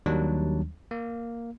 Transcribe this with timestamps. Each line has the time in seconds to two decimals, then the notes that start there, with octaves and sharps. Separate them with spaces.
0.06 D#2 D#3 F#3 G3 D4
0.91 A#3